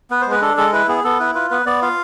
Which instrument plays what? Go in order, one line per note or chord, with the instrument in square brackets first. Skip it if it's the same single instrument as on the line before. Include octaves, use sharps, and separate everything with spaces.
[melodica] B3 B4
C5
G#3
B4
D4 A4
G#3 A4
E4 B4
B3 G#4
B3 A4
E4 B4
F4 B4
B3 B4
B3 D5
F4 F5